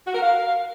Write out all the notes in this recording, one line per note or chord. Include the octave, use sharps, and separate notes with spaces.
F#4
A#4
F5